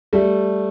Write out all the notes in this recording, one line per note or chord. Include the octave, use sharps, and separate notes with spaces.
G3 A3